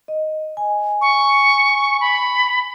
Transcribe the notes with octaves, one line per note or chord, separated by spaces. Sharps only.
D#5
G#5
C#6
B5